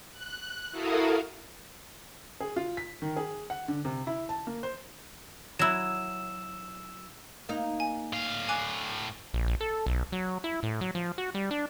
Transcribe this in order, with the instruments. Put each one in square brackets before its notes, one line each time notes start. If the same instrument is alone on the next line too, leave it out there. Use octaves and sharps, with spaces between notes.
[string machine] F#6
E4 F#4 A4 A#4 F5 D#6
[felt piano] G#4
F4
B6
D#3
G#4
F#5
D3
C3
E4
A5
A#3
C5
[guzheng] F#3 E4 [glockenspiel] E6 E7
[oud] A#3 D#4
[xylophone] G#5
[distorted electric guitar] A2 F5
[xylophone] G#5 D6 F#6
[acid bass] A#1
A#1
A4
B1
F#3
E4
A2
F#3
F3
F#4
G3
D4